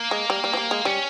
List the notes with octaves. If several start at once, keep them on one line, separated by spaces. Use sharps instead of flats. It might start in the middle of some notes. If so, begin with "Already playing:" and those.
Already playing: A#3
G#3
G3
G3
F3
G3
G#3
G3 C#4